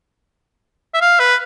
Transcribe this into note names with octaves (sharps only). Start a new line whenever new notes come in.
E5
F5
B4